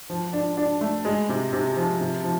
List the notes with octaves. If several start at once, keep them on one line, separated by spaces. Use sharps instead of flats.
F3
D4
D4
A3
G#3
C3
C3
F3
C3
F3